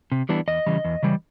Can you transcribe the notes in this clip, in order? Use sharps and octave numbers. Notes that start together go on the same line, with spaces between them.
C3
E3 G3 B3 D4
E2 D#5
C#3 E3 G3
E2
C#3 E3 G3